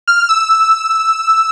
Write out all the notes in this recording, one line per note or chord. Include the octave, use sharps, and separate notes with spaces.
F6
E6